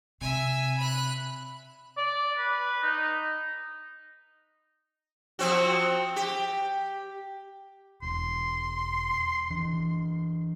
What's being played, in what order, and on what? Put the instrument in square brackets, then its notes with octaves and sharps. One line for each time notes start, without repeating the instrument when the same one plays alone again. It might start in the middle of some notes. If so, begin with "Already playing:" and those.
[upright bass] C3 [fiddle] E5 G#5
[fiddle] B5 F#6
[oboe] D5
B4
D#4
[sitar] F3 C4 F#4
G4
[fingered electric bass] E1 [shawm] C6
[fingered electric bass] E3 D4